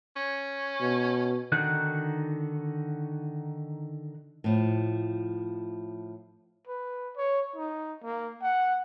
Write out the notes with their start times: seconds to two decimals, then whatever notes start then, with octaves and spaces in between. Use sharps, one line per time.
0.16 C#4
0.81 B2
1.52 D3 D#3 D#4 F#4 F#6
4.44 A2 F3
6.67 B4
7.17 C#5
7.56 D#4
8.03 A#3
8.42 F#5